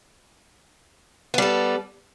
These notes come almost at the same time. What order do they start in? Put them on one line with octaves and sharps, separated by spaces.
B3 G3 A4